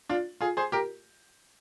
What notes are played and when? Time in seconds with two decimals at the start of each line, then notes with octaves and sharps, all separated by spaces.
0.09 D4 F4
0.41 F4 G#4
0.57 G#4 C5
0.72 G4 A#4